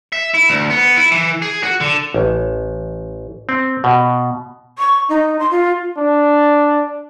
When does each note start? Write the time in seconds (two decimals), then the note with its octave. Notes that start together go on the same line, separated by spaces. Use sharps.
0.13 E5
0.34 E4
0.49 D2
0.70 B3
0.97 E4
1.12 E3
1.42 G#4
1.63 F#4
1.81 D3
2.14 A1
3.49 C4
3.84 B2
4.78 C#6
5.09 D#4
5.39 C6
5.51 F4
5.98 D4